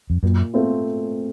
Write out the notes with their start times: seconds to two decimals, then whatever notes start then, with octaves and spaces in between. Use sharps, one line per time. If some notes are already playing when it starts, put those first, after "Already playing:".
0.10 F2
0.23 F#2 A#2
0.54 A3 C4 F4